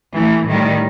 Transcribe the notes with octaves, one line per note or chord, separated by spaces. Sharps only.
E3 A3
A2 D#3 G3